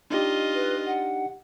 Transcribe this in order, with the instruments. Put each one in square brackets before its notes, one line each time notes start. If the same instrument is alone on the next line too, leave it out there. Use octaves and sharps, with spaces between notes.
[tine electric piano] D4 D#4 G4 [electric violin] F4 D#5
[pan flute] B4
F#5